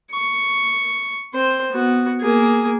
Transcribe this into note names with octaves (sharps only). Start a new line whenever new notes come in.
C#6
C4 C5
B3 F#4
A#3 G#4